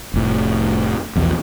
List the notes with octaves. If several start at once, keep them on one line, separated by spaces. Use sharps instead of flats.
F1 A2
A#1 E2 B2